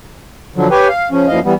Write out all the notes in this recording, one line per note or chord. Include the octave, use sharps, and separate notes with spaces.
D3 F3 F#3
G4 B4 C#5 G5 G#5
F5
C#3 F3 C#4
F#2 A#2 E3 F3 D#5 F5
E3 G3 B3